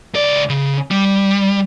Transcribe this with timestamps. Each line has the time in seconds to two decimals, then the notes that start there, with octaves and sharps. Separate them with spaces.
0.14 C#2 D5
0.49 C#3
0.91 G3